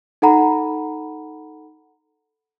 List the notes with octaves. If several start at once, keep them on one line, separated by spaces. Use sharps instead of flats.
D#4 A4 F#5 A#5 B5